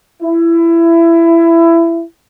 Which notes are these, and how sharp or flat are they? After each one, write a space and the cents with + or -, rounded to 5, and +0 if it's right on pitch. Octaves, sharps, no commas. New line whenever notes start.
E4 +20